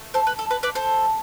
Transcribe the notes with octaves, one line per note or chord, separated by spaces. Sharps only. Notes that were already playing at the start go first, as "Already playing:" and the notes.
Already playing: A3
A4 C5
B4
A4
B4
B4 D5
A4 C5